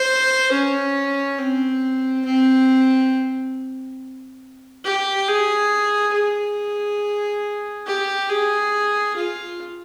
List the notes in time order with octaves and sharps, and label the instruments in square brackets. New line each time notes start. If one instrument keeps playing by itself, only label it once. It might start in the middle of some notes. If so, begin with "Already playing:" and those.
Already playing: [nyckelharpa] C5
C#4
C4
C4
G4
G#4
G#4
G4
G#4
F4